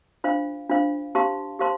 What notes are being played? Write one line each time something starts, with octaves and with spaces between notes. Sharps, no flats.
D4 F4 C5 F5
D4 F4 C5 F5
G4 C5 F5 A5 C6
G4 C5 F5 A5 C6